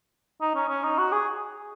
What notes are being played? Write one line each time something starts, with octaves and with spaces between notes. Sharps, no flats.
D#4
C#4
C#4
D#4
F#4
G#4